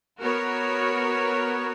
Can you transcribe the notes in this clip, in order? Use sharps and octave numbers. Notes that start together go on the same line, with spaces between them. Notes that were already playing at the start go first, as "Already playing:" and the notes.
B3 F#4 A#4 C#5